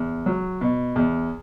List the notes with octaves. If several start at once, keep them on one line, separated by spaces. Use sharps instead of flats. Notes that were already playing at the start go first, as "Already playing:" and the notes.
Already playing: E2
F#3
B2
E2